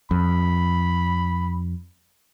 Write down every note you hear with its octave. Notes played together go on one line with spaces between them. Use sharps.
F2 B5